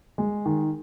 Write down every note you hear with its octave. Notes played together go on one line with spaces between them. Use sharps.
G#3
D#3